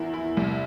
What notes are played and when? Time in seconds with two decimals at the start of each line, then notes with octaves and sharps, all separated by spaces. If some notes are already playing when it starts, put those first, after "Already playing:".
Already playing: E2 A#3 E4
0.14 E4
0.37 C2